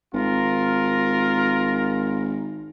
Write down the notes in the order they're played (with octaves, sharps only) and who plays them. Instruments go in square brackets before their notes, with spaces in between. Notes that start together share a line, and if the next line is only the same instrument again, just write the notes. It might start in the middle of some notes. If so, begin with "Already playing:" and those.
[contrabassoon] G#1 [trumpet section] F4 A#4